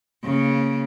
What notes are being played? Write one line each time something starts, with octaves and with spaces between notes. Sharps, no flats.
C#3 A#3